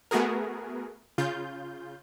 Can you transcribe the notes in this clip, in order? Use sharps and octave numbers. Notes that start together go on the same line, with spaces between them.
A3 B3 F#4 G#4 A#4
C#3 F4 G6